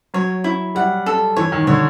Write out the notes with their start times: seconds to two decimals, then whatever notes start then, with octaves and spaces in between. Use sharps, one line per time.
0.14 F#3 C#5
0.44 E4
0.75 G3 F#5
1.06 A4
1.36 E3 C#5
1.52 D#3
1.67 D3 C#5